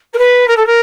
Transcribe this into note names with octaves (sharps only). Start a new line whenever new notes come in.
A#4
B4
A#4
A4
A#4